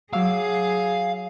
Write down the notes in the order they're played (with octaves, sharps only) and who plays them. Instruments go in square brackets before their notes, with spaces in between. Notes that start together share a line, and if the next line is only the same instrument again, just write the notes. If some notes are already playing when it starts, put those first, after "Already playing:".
[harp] F#3 D6 E6 [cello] G#4 [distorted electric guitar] F5